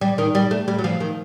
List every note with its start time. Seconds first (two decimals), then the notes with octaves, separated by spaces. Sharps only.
0.01 G3
0.18 D#3
0.35 G3
0.51 A3
0.68 G3
0.79 F#3
0.84 F3
1.00 D#3